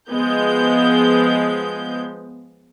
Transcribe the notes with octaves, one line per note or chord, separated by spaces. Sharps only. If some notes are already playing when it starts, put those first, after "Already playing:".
F3 G#3 B3 G6